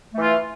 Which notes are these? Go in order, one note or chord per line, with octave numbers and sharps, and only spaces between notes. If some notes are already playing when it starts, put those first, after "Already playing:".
E3 A3 F4